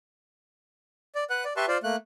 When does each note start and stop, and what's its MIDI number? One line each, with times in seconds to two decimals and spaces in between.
1.15 1.24 74
1.30 1.44 71
1.30 1.44 78
1.30 1.44 90
1.45 1.53 74
1.57 1.66 67
1.57 1.66 71
1.57 1.66 76
1.57 1.66 81
1.57 1.66 84
1.57 1.66 85
1.68 1.78 65
1.68 1.78 72
1.68 1.78 74
1.84 1.96 57
1.84 1.96 58
1.84 1.96 90